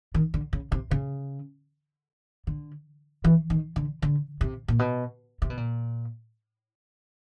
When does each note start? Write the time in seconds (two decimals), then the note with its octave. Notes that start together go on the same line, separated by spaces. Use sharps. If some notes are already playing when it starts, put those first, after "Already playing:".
0.14 D#3
0.34 D3
0.53 C#3
0.72 C3
0.91 C#3
2.47 D3
3.24 E3
3.50 D#3
3.76 D3
4.02 D3
4.41 C3
4.68 A#2
4.79 B2
5.42 C3
5.50 B2
5.57 A#2